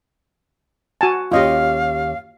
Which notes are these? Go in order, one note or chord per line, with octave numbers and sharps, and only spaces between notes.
F#4 G#5 A5
D#2 C#4 F4 G4 D#5 F5